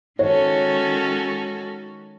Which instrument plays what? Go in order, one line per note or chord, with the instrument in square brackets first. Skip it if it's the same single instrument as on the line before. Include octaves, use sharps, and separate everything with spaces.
[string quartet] D#3 G#3 C#4 F#4 A4 [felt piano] C#5